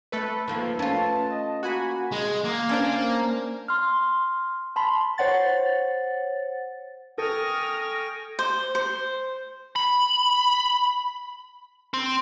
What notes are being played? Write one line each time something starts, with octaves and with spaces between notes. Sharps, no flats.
A3 A4 B4
D#3 F3 A#3
C#4 F4 A5
D#5
A#3 F#4 G#5 B5
G#3
A#3
C#4 D4 C5
C6 F6
A5 B5 C6
C5 C#5 F#5 A6
A4 G5 G#5 C#6 D#6 F6 A#6
C5
C5
B5
C4